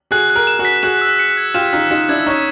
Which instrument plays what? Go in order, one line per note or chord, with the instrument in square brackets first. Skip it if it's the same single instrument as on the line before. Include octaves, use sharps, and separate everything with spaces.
[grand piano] F#4 G#4 [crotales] F#6
[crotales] F#6
[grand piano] G#4 A#4
[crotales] E7
[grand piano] F#4 G#4
[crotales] B6
[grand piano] F#4 G#4 [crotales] E7
[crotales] E6
C#7
G#6
[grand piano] F4 G4 [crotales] E7
[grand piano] D#4 F4 [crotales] E6
[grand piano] D#4 F4 [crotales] C#7
[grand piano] D4 E4 [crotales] G#6
[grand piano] C#4 D#4 [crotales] C#6